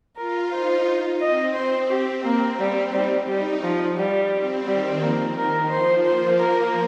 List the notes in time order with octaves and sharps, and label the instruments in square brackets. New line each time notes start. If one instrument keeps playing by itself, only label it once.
[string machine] F4 [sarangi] A#4
[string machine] D#4 [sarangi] C5
[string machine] C4 [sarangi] D#5
[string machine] C4 [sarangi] C5
[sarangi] G4
[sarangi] A#3 [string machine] C4
[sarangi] G3
[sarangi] G3 [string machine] D#4
[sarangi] G3 [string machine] D#4
[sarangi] F3
G3
[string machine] C4
[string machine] D#3 [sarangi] G3
[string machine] F3 [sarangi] A#3
[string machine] D#3 [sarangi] A#4
[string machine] F3 [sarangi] C5
[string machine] A#3 [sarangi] C5
[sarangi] A#4